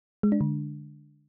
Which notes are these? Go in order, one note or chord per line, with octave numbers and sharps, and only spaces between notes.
G#3
D4
D3